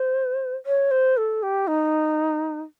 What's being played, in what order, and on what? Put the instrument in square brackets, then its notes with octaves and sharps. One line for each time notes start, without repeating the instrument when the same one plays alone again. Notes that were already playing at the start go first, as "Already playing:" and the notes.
Already playing: [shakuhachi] C5
C#5
C5
A4
G4
D#4